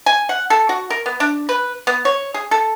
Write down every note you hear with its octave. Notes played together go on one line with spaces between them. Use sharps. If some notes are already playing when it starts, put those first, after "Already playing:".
G#5
F#5
A4
F#4
A#4
B3
D4
B4
B3
C#5
G#4
A4